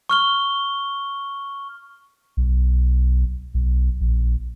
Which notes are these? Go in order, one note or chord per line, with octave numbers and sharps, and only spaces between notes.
C#6 F6 G7
B1
B1
A#1